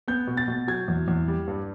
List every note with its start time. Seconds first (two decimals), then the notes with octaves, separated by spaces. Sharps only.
0.08 B3 G6
0.27 B2
0.37 A6
0.48 B2
0.68 F#3 G#6
0.88 E2
1.08 E2
1.28 G3
1.48 G2